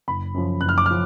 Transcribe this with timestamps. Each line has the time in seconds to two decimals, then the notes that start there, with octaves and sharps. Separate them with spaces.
0.08 F#1 B5
0.34 F#2 F3
0.61 F#1 F#6
0.69 F6
0.78 D6
0.86 F3 F6